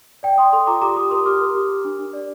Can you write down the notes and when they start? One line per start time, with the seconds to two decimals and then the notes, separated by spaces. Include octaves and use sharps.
0.23 D5 G5
0.38 D5 C6 D#6
0.53 A4 C6 D#6
0.67 F4 A#5 D6
0.81 G4 A#5 D6
0.96 G4 C6 D#6
1.11 A#4 C6 D#6
1.26 G4 D6 F6
1.41 A#4
1.55 G4
1.69 G4
1.85 D4
1.98 D4
2.13 D5